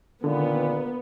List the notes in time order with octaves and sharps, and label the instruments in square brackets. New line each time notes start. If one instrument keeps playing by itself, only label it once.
[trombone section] C#2 A#2 D#3 [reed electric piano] D3 [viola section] B3